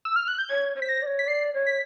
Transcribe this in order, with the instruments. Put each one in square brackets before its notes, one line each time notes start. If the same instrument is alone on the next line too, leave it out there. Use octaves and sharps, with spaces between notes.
[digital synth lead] E6
F6
F#6
G6
[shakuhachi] C#5 [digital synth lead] G#6
[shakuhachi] C#5
[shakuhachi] C5 [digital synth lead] B6
[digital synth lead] A#6
[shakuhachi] D5
C#5
[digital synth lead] B6
[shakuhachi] D5 [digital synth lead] C7
[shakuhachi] C#5
[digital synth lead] B6